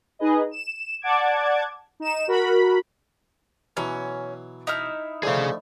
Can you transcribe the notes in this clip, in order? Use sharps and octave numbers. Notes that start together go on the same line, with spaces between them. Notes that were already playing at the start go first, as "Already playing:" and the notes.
D#4 G#4 B4 D#5
E7
D5 F#5 A5 D6 G#6
D#4 E7
F#4 A#4 B5
B2 E3 F#3 C#4
D#4 E4 F6
D3 F3 A3 G#4 F5